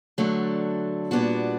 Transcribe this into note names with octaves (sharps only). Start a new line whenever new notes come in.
D3 F#3 A3 D4
A#2 G3 B3 D4 F#4